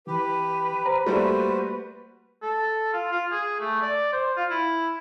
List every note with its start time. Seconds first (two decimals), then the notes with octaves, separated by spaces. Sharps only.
0.07 E3 G4 B4
0.86 C5 A#5
1.06 G3 A3 A#3 F#4 C5
2.42 A4
2.93 F4
3.12 F4
3.32 G#4
3.60 A3
3.82 D5
4.12 C5
4.37 F4
4.51 E4